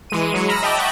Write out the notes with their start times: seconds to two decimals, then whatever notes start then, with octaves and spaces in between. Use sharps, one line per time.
0.10 E3 G#3 D#7
0.34 F#3 G#3 C#7
0.48 A#5 B5 E6 F6 A#6
0.62 D#5 E5 G5 A5 B5 D6
0.78 F#5 G5 A5 B5 C#6 D6